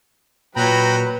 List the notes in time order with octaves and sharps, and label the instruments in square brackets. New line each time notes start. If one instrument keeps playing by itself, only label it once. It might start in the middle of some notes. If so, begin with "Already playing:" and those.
[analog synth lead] A#2 [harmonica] F#3 [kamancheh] B4 [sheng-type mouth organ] G5 A#5 B5